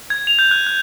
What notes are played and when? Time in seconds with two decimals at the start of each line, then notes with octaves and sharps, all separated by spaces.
0.10 G#6
0.27 F7
0.39 G6
0.51 F#6
0.67 F#6